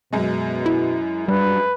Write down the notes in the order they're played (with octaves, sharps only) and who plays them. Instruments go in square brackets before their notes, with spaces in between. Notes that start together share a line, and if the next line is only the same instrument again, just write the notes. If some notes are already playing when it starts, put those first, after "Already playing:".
[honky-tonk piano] F#2 G#3 [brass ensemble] B2
[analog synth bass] E4
[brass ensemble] G2 D4 F#4 [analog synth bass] G3 [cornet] B4